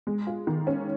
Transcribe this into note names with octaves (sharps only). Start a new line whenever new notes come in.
G#3
F4
D#3
C#4